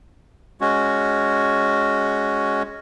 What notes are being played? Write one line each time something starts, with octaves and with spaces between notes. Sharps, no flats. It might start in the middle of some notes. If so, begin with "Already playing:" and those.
G#3 C#4 F#4